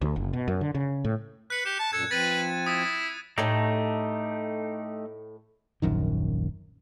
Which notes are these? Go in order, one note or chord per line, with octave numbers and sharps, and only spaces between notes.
D2
F#1
B2
F#2
D3
C#3
A2
B4 F#6 C#7
G4 E7
A5
F#2 A#2 A4 G#6
F3 C4 B4 A6 D#7
E4 D#6
A2 A3 D#4 G4 A4 C#5
D#1 A#1 F#2 D#3